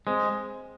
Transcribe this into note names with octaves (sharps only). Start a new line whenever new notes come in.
G#3 C4